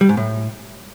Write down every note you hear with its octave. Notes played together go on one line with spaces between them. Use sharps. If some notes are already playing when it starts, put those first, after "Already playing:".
G3
G#2
A2